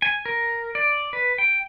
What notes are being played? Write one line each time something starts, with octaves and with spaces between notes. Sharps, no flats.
G#5
A#4
D5
B4
G5